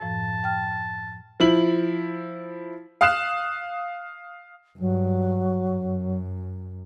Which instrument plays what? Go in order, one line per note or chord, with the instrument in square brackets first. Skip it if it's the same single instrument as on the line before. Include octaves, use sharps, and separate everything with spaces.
[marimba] F#2 A2 F3 [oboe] A5
[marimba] G5 F6
[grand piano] F3 E4 F#7
[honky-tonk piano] F5 D#6 F6 F#6 C7 E7
[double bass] G2 [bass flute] F#3
[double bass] F#2